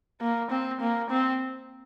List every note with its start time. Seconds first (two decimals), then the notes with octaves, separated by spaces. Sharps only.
0.21 A#3
0.51 C4
0.81 A#3
1.10 C4